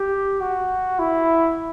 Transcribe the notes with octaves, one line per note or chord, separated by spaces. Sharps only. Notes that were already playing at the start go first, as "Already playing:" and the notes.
Already playing: G4
F#4
E4